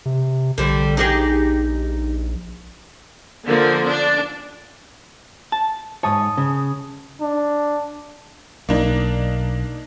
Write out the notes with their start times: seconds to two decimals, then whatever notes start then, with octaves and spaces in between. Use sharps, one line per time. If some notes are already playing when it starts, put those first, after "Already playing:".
0.05 C3
0.58 A#1 D3 G3
0.97 D#4 G4 G#4
3.46 D3 F3 A#3
3.88 D4
5.52 A5
6.03 G#2 C#5 A5 D#6
6.37 C#3
7.22 D4
8.69 B1 A#3 D4 D#4